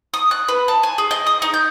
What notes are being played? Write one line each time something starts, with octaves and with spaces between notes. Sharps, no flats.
D#6
F#6
B4
A5
G#5
G#4
D#5
D#6
D#4
G6